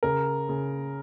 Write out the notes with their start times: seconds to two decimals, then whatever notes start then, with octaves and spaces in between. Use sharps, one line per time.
0.03 C#3 A#4
0.49 C#3